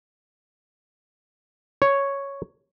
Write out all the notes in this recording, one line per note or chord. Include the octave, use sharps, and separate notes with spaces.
C#5